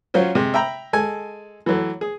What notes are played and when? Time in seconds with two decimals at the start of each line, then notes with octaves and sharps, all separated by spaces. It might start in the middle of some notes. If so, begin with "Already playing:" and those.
0.14 F#3 C#4 F4 C5
0.35 C3 G#3
0.54 E5 G5 A#5 B5
0.93 G#3 A4 G#5
1.66 E3 F#3 A3
2.01 G#4